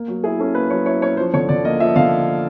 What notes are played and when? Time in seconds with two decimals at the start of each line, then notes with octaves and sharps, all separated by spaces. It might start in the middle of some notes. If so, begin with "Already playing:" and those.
Already playing: A#3
0.08 F#3
0.24 E4 G#4
0.39 C#4 A4
0.55 A#3 B4
0.70 F#3 C#5
0.86 E4 C#5
1.02 C#4 C#5
1.17 F3 C5
1.33 D3 C#5
1.49 D3 D5
1.65 A#3 D#5
1.79 F3 E5
1.96 D3 F5